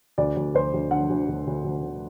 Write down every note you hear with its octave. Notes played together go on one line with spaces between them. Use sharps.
D2 D5
D2
D2 C5
D2
D3 F#5
D2
D2
D2
D2
D3